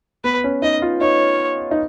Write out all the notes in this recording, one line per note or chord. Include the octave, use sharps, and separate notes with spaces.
B3 B4
C#4
D#4 D#5
F4
D#4 C#5
D#4